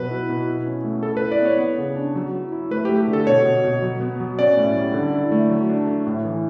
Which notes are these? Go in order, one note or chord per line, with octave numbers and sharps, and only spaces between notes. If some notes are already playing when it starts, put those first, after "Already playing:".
Already playing: B2 F#3 B4
E4
B2
E4
C#4
A3
E4 A4
B4
E4
D5
B3 C#5
B3
C#3
D4
F#3
E4
E4
A3 B4
G4
A3
G4
D3
A4
B2 C#5
B2
B2
F#3
B3
F#3
C#4 D5
A2
G3
D3
E4
A3
F#3
D4
A3
A2
E3